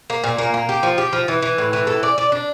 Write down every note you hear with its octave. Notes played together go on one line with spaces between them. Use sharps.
A#3
A#2
A#3
A#3
G4
F3
G4
F3
E3
E3
A2
E3
A4
D5
D5
D4